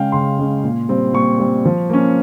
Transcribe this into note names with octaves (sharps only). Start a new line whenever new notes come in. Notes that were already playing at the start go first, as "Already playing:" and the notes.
Already playing: C#3 G#3 C#4 F5 G5
C#3 C6
G#3 C#4
A#2
G3 C4
A#2 C#6
G3 C4
F3
A#3 C#4